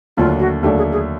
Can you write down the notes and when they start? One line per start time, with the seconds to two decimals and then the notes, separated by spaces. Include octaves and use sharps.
0.17 D#2 D3 F#3 A3 D4 F4
0.39 F#4
0.63 D#2 D3 F#3 A3 D4 G4
0.77 G#4
0.92 G#4